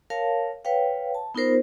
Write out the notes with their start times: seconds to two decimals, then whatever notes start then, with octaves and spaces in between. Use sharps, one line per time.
0.10 A#4 C#5 F5 A5
0.65 B4 C#5 F5 G5
1.15 A5
1.35 B3 D#4 F4 A#4 C5